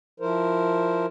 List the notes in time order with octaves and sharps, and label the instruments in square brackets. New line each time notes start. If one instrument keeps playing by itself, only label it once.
[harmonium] F3 E4 A#4 C5